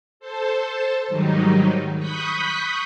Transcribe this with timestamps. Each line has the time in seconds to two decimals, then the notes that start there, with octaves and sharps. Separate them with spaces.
0.20 A4 C5 A5
1.08 G#2 D#3 F#3 G3 D#4
1.98 B5 C#6 D#6 F#6 G6 B6